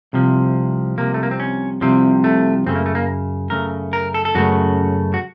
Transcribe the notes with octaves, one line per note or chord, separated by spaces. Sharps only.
C2 C3 F3
C2 C3 F3 A#3
A3
A#3
C4
C#4
C2 C3 F3 C4
A3
F#2 C#3 A3 C4
A#3
A3
A#3
F#2 C#3 A3 A#4
A#4
A4
A4
F#2 C#3 A3 F#4
F#4